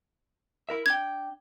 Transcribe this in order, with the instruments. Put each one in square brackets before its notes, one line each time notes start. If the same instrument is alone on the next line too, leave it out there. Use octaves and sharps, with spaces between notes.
[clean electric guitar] E4 A#4 E5
[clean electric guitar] D4 G5 [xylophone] G#6